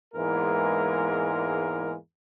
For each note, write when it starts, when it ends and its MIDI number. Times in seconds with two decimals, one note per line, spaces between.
0.14 1.94 40
0.14 1.94 44
0.14 1.94 52
0.14 1.94 56
0.14 1.94 58
0.14 1.94 70